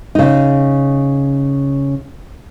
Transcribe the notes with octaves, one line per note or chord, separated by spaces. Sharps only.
C#3 D#4